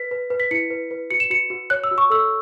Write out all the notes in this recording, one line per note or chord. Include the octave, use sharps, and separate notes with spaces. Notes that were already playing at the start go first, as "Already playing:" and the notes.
Already playing: B4 B6
B4
B4
B6
E4 C#7
B4
B4
F#4 C#7
E7
F#4 C#7
F#4
C#5 F#6
E6
F#4
C#6
A4 E6